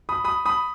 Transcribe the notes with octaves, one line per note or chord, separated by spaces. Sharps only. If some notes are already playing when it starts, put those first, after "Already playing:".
B5 D#6
B5 D#6
B5 D#6